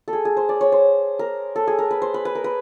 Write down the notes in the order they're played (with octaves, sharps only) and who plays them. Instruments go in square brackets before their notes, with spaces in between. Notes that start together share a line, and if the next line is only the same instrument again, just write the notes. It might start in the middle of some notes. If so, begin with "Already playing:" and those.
[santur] A4
G#4
G#4
C5
D5
C#5
C5
A#4
A4
G#4
A#4
B4
C5
B4
B4
A#4
B4